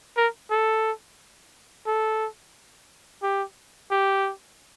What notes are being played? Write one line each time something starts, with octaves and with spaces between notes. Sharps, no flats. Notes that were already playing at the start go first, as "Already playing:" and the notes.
A#4
A4
A4
G4
G4